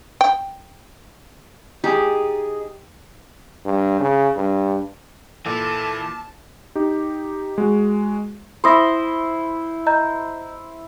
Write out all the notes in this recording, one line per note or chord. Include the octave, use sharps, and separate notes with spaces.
G5
D#4 G4 G#4
G2
C#3
G2
A#2 E3 A4 A5
D#4 G4
G#3 F#4
E4 C5 C6 D#6 A#6
D#5 A#5 G6